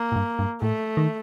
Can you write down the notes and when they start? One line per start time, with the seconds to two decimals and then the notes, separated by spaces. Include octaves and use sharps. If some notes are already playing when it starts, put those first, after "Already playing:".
Already playing: A#3
0.12 A2
0.16 G2
0.39 G2
0.62 A2 A3
0.97 D#3